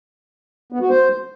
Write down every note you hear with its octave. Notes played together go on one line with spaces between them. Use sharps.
B3
F#4
C5